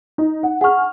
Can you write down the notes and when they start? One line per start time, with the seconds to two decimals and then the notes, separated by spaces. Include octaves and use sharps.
0.18 D#4
0.43 F#5
0.61 G#4 F#5 C#6 F6